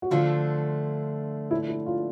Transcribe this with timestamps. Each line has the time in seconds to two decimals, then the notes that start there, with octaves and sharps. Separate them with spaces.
0.02 F#4
0.11 D3 F3 A3 D4 F4
1.51 E4
1.69 E4
1.86 F4